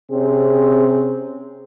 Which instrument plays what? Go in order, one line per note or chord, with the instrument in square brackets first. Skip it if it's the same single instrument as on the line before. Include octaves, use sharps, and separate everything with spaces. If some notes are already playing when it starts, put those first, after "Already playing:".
[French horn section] C3 C4 C#4 G#4